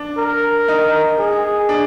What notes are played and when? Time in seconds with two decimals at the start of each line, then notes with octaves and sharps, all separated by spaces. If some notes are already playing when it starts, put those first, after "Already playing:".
Already playing: D4
0.18 A#4
0.68 D#4
1.19 G#4
1.69 D4